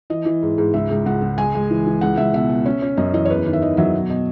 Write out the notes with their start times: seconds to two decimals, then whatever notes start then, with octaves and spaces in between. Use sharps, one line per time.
0.10 E3 D#5
0.25 E3
0.43 G#2
0.58 G#2
0.74 C#2 E5
0.91 C#2
1.06 C#2 F#5
1.22 C#2
1.38 G#3 G#5
1.54 G#3
1.70 E3
1.86 E3
2.01 C#2 F#5
2.17 C#2 E5
2.33 B2 E5
2.50 B2
2.66 C#4
2.82 C#4
2.97 F#2 D#5
3.13 E3 D#5
3.25 C#5
3.30 E2 B4
3.46 D#3
3.53 E5
3.62 D#3 D#5
3.77 F#3 E5
3.94 B2
4.10 B2 D#5